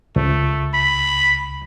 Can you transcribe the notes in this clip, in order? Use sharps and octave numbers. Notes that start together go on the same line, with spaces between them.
C#2 A3
B5